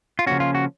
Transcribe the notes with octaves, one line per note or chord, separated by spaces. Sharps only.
F4
C#3 F3 A#3 C#4 F#4
F4
F#4